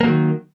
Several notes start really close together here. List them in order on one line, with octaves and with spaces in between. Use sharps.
A#3 F#3 D#3